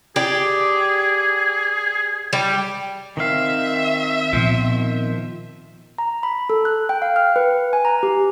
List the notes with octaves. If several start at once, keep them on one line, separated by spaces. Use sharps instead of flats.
G4 G#4 D5
G3
D#3 C4 E5 F5
A#2 F3 B3
A#5
B5
A4
F#6
G5
F5
F6
B4
G#5
A#5
G4